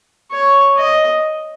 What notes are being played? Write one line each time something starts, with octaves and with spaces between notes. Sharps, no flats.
C#5
D#5